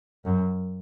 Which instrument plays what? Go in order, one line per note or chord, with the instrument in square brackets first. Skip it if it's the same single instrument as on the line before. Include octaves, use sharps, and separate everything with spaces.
[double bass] F#2